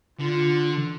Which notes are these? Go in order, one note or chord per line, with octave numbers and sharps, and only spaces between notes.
D3 F4